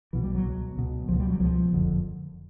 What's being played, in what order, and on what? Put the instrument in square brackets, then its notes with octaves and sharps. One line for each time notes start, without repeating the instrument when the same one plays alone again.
[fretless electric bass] B1 B2 E3
G3
F#3
C#2 B2
C#2 B2
C#2 B2 F3
G3
F#3
C#2 B2 F3
F#1 F2 D3